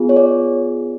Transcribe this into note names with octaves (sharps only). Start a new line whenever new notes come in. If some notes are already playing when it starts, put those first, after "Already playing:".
Already playing: B3 F4 G#4
C#5
D5